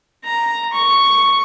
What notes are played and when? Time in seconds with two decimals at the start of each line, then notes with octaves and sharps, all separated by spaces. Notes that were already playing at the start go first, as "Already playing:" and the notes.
0.24 A#5
0.73 C#6